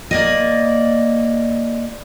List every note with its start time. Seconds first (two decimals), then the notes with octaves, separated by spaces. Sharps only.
0.11 A#3 D5 D#5